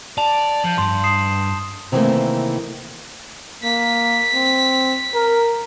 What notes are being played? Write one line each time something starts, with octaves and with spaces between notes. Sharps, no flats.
D5 A5 F7
F3 G6 F#7
G2 C6
D#6 C7 E7
C3 D#3 E3 G3 A3 A#3
A#3 B6
C4
A#4